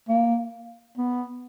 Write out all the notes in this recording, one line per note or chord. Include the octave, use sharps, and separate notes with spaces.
A#3
B3